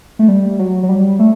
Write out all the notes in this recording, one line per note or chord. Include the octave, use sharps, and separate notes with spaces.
A3
G3
F#3
F#3
G3
A3